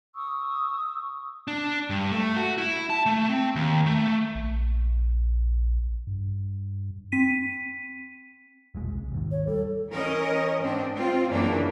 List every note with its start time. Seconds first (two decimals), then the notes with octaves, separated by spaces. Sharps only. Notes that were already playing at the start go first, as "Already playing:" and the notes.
0.14 C#6 D#6 E6
1.48 D4
1.90 G2
2.12 A3
2.36 F#4
2.58 E4
2.90 A5
3.06 A3
3.29 C4
3.56 D#2
3.86 A3
4.35 A#1
6.07 G2
7.12 C4 B6 D#7
8.75 E1 A#1 G#3
8.93 C2
9.12 D#2 G#2 D#3
9.31 C#5
9.47 G3 A4
9.90 E3 C#4 A#4 D#5
10.60 G#2 C4 D4
10.95 C4 F4
11.30 F#2 C#3 E3 A#3 D4